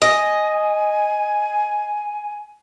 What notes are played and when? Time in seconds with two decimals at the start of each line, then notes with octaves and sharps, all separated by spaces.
0.02 D#5 G#5